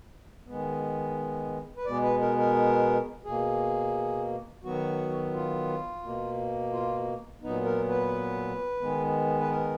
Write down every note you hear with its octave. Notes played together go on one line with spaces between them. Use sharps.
D#3 G#3 B3
B4
B2 G#3 B3 D5
B4
A#4
A#4
B2 A#3 G#4
D#3 F#3 B3 F#4
F4
B2 A#3
F4
A#2 F#3 B3 D#4
A#4
B4
D#3 G#3 B3
B4
A#4